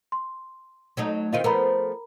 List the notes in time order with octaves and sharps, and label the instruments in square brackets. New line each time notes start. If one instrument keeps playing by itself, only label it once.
[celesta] C6
[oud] F#3 A3 D#4
[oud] D#3 C4 F4 [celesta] D#5 F5 D#7
[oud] F3 A3 B3 [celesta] A#4 A#5 B5